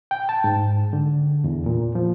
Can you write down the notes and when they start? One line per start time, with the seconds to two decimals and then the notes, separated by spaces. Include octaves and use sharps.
0.11 G5
0.29 A5
0.44 G#2
0.93 D3
1.44 E2
1.66 A#2
1.95 F3